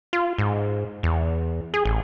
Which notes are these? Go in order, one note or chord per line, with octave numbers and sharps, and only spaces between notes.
F4
G#2
E2
G#4
A1